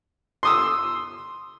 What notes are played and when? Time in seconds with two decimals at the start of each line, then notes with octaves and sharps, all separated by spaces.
0.43 C6 D#6 E6